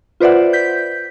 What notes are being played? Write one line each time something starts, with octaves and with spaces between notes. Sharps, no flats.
F4 B4 C5 D5 E5 F#5
G6 B6